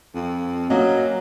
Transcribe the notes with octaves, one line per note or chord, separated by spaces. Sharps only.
F2
F#3 A#3 C#4 D#5